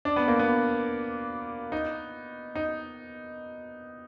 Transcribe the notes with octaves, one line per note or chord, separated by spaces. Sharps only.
D4
B3
A#3
B3
D#4
D#4